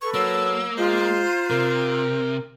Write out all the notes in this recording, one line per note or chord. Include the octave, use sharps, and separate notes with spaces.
A4 B4 C#6
F#3 A#3 E6
G#3 F4 C5 A#5
C3 A#4